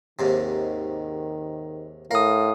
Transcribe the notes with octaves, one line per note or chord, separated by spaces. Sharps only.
D#2 G#2 C3 D#3
A2 A#4 F5 D#6